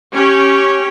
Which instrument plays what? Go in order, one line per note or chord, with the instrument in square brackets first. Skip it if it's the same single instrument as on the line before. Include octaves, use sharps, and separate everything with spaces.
[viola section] C#4 G4 C#5